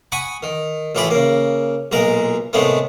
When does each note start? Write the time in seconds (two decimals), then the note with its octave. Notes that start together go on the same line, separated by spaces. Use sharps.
0.12 F#5 G#5 B5 C#6 D#6
0.43 D#3
0.95 A1 A2 F4 G4 G#4 B5
1.10 C#3 A#3
1.92 B1 A#2 G#3 A#4 A#5
2.53 A2 C3 D#3 G#3 A3 B3